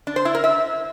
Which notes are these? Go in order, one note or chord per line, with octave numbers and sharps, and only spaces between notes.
D4
C5
E4
A#4
E5